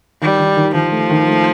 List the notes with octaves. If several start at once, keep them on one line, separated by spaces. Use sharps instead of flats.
D#3 G3
D#3
D#3
D#3 F3
A3
D#3
A3